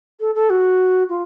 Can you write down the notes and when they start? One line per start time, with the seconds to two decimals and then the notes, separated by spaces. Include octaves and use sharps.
0.20 A4
0.35 A4
0.50 F#4
1.09 F4